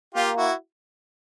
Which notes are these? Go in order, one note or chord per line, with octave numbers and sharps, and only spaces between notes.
A#3 F4 G4
E4 F#4